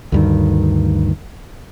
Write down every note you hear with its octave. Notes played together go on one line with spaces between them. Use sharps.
D2 G2 D#3